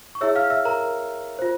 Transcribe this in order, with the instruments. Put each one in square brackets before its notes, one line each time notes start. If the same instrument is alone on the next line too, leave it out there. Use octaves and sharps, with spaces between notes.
[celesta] C#6
E4 G#4 C#5 E5 E6
F5 F6
E5 E6
A#4 A#5
F4 C5